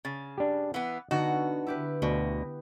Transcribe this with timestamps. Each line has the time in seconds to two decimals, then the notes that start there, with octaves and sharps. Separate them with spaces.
0.05 C#3 A6
0.38 D4 G4
0.74 E3 B3 F#5
1.11 D3 B3 D#4 F#4
1.67 E4 G4 B4
2.02 D2 B2